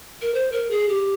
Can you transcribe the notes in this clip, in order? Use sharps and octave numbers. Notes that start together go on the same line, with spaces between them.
A#4
C5
A#4
G#4
G4